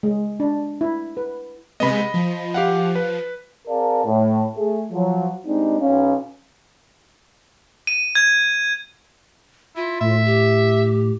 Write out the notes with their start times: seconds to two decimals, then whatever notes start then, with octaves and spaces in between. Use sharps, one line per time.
0.03 G#3
0.40 D4
0.81 E4
1.17 B4
1.80 C3 G#3 B3 D#5 B5
2.14 F3
2.54 G4 F5 F#5
2.95 B4
3.68 C4 G#4 A#4 D5 F5 A5
4.05 A2
4.56 A3 G#4
4.91 F3 F#3
5.46 G3 G#3 C4 D4 D#4
5.80 B1 C#4 F5
7.87 D#7
8.15 G#6
9.76 E4 F4
10.00 A2 E5
10.26 G4